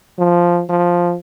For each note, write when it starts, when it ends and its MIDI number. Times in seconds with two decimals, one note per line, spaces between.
0.19 0.63 53
0.69 1.15 53